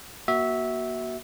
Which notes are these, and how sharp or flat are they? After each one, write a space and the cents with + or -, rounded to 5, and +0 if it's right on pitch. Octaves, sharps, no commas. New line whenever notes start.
A#3 +30 F#4 +10 E5 -15